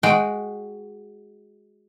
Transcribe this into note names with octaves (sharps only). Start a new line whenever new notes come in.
G#3 F#4 G5